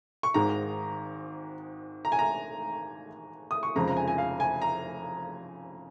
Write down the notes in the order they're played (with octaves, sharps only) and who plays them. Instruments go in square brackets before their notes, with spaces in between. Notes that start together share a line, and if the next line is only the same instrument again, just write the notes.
[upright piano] C#6
G#1 G#2 D#3 G#3 A#5
A#5
G#5
A#5
D#6
C#6
F1 F2 C#3 F3 G#3 A#5
A#5
G#5
G#5
F5
G#5
A#5